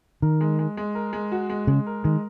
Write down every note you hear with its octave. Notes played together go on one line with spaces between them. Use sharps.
D#3 A#4
G#3
G#3
G#3
A#4
G#3
F#4
G#3
C#3 G#3
A#4
D#3 G#3